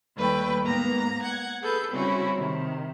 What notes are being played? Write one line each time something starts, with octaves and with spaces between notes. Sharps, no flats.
D#2 G3 A3 B4 G5
G#2 A#3 B3 A#5 A#6
F#5 G#6
G#4 A4 B4 G6
C#3 G3 C4 C#4 E4 F#4
C3 D#3